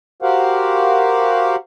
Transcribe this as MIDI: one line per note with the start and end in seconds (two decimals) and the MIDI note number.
0.22 1.56 66
0.22 1.56 67
0.22 1.56 70
0.22 1.56 72
0.22 1.56 77
0.22 1.56 78